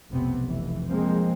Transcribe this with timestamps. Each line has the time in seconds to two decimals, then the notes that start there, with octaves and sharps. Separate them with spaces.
0.10 F1 B1 C3 B3 C4
0.44 F1 E3
0.88 F3 G#3 A#3 C4